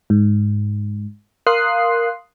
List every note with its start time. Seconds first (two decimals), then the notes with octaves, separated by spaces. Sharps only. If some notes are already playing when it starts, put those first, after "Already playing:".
0.10 G#2
1.47 A#4 F5 C6 D#6 F#6 C7